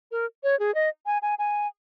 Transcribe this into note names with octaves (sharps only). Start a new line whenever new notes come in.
A#4
C#5
G#4
D#5
G#5
G#5
G#5